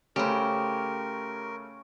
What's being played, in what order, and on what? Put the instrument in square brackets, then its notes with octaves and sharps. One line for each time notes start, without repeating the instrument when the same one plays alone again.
[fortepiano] C#3 A3 [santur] C#4 B5 [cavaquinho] G4 C5 [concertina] A#4